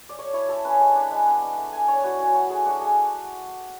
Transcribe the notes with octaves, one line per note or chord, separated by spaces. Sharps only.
D5
A3 C#5
E4 C#5
A3 A4
C#4 B4
G#3 A5
D4
G#3 B5
B3
D4
A3
A3 G#5
D4 C#5
E4 F#4
C#4
F#3 F#4
A3 G#4
D4 F#4
A3 G#4